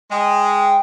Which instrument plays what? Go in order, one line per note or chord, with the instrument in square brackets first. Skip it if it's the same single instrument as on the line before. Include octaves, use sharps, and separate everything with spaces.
[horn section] G#3 [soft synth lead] G5